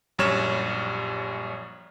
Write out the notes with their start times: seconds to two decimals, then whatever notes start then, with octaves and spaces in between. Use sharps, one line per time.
0.19 A#1 F#2 G3 C#5 F6 E7